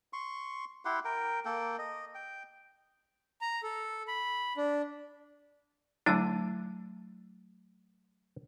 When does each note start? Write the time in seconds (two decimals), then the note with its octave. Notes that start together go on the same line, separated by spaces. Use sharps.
0.13 C6 C#6
0.85 E4 G4 F#5 C6
1.05 A#4 G5
1.45 A#3 A4 G5
1.79 D#5
2.15 G5
3.41 A#5
3.63 A4
4.08 B5
4.57 D4
6.06 D3 F#3 A3 D4 E4 A5